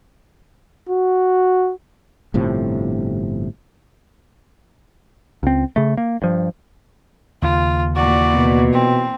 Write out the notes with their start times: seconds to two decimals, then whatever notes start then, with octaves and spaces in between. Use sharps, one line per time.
0.89 F#4
2.34 G1 A2 C3 F3
5.43 C#2 C4
5.76 C#3 A3
5.97 A#3
6.22 G2 F3
7.42 D#2 C#3 F4
7.95 A#2 E3 F#4 D5
8.35 B2
8.73 C4